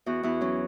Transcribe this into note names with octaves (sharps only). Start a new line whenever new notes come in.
E2 F#4
E2 E4
F#3 C#4